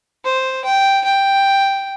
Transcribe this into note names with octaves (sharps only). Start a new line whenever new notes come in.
C5
G5
G5